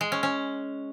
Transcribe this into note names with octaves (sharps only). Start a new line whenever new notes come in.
G#3
C#4
C#4